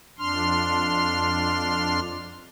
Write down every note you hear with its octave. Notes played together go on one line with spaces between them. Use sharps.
F2 D4 C6 F6